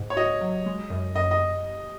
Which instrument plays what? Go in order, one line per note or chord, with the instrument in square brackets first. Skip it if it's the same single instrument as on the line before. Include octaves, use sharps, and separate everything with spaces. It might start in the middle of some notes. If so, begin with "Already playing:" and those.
Already playing: [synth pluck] G#2
[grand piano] C#5
[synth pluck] F#4 [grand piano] D#5
[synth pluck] F#3
G#3
F#2
[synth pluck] F#2 [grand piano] D#5
[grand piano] D#5